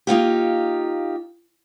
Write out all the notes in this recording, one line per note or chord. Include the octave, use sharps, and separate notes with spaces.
A#3 D#4 F4 G4